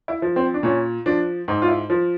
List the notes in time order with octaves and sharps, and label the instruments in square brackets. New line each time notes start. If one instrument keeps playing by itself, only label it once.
[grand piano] E4
F3
C4
D4
A#2 C#4
F3 D4
G#2 D#4
F4
E4
F3